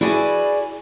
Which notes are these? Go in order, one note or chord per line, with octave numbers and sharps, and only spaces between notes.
E4 F#4 G#4 B4 D5 G#5